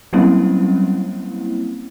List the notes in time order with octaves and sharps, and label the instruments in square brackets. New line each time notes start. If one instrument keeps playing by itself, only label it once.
[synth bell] F#3 G3 A#3 C4 C#4 E4